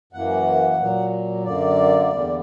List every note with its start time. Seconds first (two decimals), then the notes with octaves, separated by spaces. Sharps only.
0.13 F#2 E3 A#3 F#5
0.79 A#2 F#3 A#3
1.44 F#2 D3 A#3 D5
2.10 E2 D3 G3 A#3